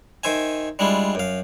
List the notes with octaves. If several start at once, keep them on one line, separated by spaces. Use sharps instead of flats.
D#3 C5 E5 G#5
G3 G#3 D4 E4 F4
F#2 F5